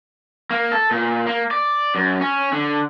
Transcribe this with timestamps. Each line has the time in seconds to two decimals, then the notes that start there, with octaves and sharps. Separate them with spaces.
0.51 A#3
0.72 A4
0.91 A#2
1.27 A#3
1.51 D5
1.95 F#2
2.21 C#4
2.53 D3